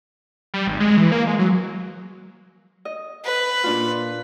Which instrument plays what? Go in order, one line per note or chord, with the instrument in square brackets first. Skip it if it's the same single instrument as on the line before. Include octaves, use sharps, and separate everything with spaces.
[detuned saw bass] G3
G#1
G#3
E3
A#3
G#3
F#3
[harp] D#5
[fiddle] B4
[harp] A#2 D4 F4